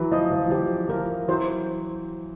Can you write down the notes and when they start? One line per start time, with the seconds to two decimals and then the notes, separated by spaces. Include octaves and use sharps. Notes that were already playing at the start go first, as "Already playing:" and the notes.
Already playing: E3 F#3 B4
0.11 F3 D#5
0.31 F3
0.50 F3 G4
0.89 F3 A#4
1.28 E3 F#3 C5